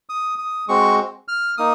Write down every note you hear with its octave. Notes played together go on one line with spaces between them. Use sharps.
D#6
D#6
G#3 C4 F#4 C#6
F6
A#3 D#4 D#6